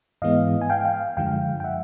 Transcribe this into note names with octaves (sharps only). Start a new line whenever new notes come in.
G#2 E3 G#3 B3 D#5 F5
G#5
F5 G5
F5 G5
F#2 D3 F3 G#3 F5 G5
G5
E5 F#5